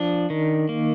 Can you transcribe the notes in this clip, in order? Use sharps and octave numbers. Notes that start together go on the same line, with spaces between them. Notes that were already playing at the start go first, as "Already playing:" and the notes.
Already playing: F3 D4
D#3
A#3